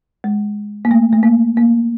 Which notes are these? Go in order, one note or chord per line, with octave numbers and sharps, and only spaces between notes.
G#3
A#3
A3
A3
A#3
A#3